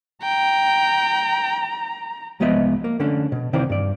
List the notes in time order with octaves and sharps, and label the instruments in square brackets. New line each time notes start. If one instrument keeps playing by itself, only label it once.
[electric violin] G5 [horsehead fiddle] A#5
[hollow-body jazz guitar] C2 F3 G#3 B3 D#5 E5
A#3
D3 A3 C#4 D4
B2
C3 D#3 E3 C4 D5
G2 D5